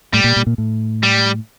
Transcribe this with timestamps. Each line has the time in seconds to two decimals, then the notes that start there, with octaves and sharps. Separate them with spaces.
0.13 A2 G3
0.24 A#2
0.36 A#2
0.47 A#2
0.58 A2
1.03 G3